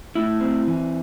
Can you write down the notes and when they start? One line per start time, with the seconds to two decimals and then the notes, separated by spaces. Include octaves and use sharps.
0.15 A2 E4
0.41 C4
0.67 E3